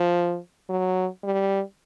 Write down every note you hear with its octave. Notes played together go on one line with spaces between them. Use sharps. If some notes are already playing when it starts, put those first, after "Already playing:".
Already playing: F3
F#3
G3